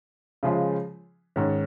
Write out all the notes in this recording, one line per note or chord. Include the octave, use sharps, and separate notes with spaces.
C#3 F3 G#3 F4
G#2 D#3 C#4